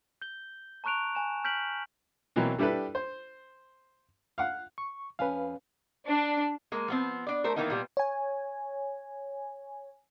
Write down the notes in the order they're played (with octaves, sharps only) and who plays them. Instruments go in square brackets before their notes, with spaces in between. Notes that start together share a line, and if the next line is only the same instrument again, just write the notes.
[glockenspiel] G6 G7
A5 A#5 C#6 F#6 D7 F7
G#5 E7
F6 G6 B6 D7 F#7
[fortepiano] B2 E3 F#3 A#3 C4
G3 D4 E4 G4 A4 B4
C5
F5 F#5
[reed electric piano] C#6
[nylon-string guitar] F2 C#4 G#5 [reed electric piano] B4 F5
[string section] D4
[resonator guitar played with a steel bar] G#3 A#3
F3 B3 C4
D4 D5
A3 A#4 C5
D#3 E3 A#3 B3 D#4
A#2 G3 B3
[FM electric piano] C#5 G#5